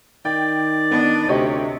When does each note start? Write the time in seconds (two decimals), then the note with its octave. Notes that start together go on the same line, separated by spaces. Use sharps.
0.25 D#3 D5 G5
0.91 B3 D4 D#5
1.29 D2 C3 G4 C#5 D#5